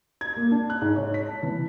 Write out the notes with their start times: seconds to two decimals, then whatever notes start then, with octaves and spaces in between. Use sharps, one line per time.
0.21 G#6
0.37 A#3
0.51 D4
0.70 F#6
0.82 G#2
0.96 C#5
1.14 B6
1.28 A5
1.43 E3